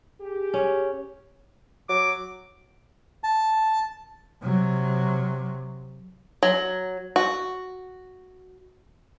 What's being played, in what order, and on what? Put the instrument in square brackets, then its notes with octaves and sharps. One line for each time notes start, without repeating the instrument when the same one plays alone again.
[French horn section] G4 G#4
[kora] C#4
[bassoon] F#3 [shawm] D6
[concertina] A5
[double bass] C3 F#3
[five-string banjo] F#3
F#4